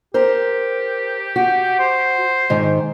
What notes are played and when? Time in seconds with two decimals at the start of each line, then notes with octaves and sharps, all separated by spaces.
0.14 G4 A#4 C5
1.36 F#4
1.79 C5
2.50 G#2 D#3